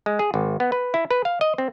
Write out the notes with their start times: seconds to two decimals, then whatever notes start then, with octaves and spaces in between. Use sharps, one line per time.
0.06 G#3
0.19 G#4
0.34 G#1
0.60 B3
0.72 B4
0.94 E4
1.11 B4
1.25 F5
1.41 D#5
1.58 C4